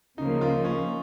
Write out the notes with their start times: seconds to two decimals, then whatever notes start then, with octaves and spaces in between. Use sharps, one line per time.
0.18 C#3 F3 A#3 D#4
0.41 F4
0.65 C#4